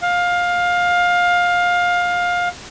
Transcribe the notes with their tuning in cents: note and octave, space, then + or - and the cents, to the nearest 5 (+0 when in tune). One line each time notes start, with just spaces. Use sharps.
F5 +20